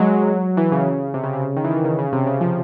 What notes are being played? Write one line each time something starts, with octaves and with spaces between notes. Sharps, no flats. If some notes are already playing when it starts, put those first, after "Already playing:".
Already playing: F#3 G#3
E3
C#3
C3
C#3
C3
C#3
D#3
E3
D#3
C#3
C#3
C3
C#3
F3